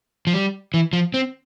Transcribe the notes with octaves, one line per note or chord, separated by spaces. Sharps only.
F3
G3
E3
F3
C4